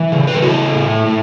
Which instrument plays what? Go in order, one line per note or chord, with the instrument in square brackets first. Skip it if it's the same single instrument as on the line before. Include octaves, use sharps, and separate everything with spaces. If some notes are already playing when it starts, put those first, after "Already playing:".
Already playing: [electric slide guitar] E3
C#3
B4
A4
E4 F#4
A4
A2
A2